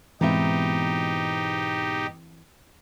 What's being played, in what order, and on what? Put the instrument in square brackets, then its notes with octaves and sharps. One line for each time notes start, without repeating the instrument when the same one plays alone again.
[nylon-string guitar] G#2 B2 E5 [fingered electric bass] E3 C4 [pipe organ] D#4 G4